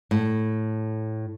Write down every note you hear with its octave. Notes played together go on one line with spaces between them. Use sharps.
A2